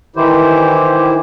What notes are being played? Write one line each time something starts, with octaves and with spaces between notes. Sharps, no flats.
D#3 E3 E4 G4 C5